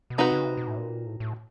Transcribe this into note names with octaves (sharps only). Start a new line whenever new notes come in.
B2
C3 C4 D#4 F#4 B4
C#3
C3
B2
A2
A#2
A2
A2